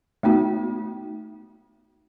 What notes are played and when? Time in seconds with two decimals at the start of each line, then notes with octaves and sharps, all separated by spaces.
0.23 A3 B3 D#4 F#4